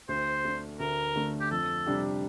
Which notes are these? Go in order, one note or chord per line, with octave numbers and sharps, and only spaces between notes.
D2 C5
D3 A3
D2 A#4
D3 A3
G4
F2 A4
C3 G3 D4 G4